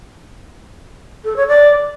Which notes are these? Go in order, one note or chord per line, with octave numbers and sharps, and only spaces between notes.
A4
C#5
D5